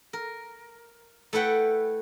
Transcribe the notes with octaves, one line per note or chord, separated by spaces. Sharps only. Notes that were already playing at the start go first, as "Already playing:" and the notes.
A#4
A3 E4 B4 F#5 G5